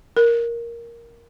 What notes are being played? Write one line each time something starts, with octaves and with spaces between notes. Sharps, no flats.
A#4